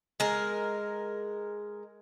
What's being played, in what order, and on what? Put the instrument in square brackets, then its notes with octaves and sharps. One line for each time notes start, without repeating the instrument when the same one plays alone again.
[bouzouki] G#3 A#4